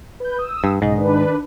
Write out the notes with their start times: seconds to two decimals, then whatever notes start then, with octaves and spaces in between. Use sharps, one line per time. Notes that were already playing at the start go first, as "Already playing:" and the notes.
0.20 B4 G6
0.38 D#6 E6
0.64 G2
0.82 B1 G#2 C#3 D#5
0.94 D#3 D4 B4